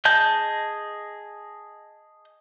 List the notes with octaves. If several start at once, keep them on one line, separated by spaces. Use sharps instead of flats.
G#4 D#5 A5 G6